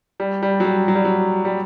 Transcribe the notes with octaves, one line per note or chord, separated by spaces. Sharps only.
G3
G3
F#3
G3
F#3
G3
F#3
G3